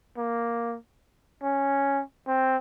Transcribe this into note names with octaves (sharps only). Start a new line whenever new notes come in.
A#3
C#4
C4